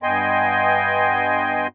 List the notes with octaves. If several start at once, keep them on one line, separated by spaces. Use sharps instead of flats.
G2 B3 D#5 G5 G#5 C6